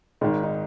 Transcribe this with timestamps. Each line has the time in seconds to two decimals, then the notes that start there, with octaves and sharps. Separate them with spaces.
0.21 G#1 G#2 D#3 D#4
0.43 D#4